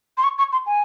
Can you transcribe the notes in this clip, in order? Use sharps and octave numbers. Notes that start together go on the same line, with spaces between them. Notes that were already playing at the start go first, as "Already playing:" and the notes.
C6
C#6
C#6
C6
G#5